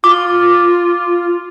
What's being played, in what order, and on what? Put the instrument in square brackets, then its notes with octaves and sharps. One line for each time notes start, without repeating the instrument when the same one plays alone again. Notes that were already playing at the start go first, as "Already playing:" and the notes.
[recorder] F4 [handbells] D6